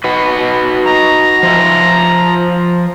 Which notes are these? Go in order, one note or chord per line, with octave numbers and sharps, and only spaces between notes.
D#4 F#4 B4
A#5
F3 F4 E5